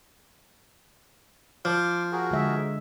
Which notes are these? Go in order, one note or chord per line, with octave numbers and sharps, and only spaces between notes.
F3 C6 D6
F#4 G#4 A#4
D3 G#3 E5